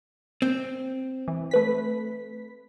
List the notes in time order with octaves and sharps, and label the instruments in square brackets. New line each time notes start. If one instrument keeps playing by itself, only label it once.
[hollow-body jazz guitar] C4
[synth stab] E3
A3 B4 B6